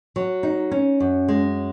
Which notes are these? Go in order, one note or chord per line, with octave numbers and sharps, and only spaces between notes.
F#3
D#4
C#4
F#2
G#3